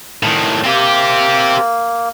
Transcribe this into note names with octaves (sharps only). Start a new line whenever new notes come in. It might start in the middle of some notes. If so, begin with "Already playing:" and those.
A2 D#3
A#3 C4 G4